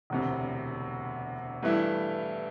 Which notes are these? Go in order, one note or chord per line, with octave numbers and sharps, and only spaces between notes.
E1 D2 C3
G2 E3 A3 E4